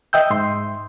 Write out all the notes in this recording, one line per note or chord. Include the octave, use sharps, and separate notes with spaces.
D#5 E5 G5 E6 G6
G#2 C6